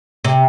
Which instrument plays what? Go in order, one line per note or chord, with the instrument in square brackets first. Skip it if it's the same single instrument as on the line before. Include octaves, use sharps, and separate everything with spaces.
[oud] C3